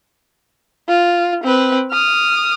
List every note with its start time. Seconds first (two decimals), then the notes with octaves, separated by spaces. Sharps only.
0.89 F4
1.44 C4 B4
1.92 D#6 F6